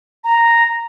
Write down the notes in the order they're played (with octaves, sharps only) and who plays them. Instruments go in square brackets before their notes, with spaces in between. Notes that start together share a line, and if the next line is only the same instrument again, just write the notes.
[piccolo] A#5